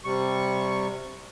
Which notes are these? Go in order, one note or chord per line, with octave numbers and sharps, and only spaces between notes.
C3 G3 C#6